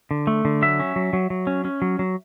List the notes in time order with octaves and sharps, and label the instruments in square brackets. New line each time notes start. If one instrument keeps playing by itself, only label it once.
[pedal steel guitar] D3
A3
D3
F#3 E5
C#4
F#3
F#3
F#3
C#4
C#4
F#3
F#3